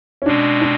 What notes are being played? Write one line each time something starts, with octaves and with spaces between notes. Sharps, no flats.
C#4
B2 G#3 C4 D4
D4